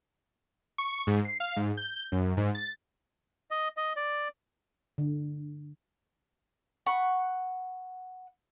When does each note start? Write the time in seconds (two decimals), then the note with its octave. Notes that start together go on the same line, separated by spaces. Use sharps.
0.78 C#6
1.07 G#2
1.25 C7
1.40 F5
1.56 G#2
1.77 G6
2.12 F#2
2.37 G#2
2.55 A6
3.51 D#5
3.77 D#5
3.96 D5
4.98 D3
6.86 F#5 B5 C#6